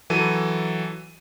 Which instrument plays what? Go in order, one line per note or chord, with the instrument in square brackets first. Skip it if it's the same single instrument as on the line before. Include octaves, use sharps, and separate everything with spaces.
[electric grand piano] E3 F#3 A4 D#7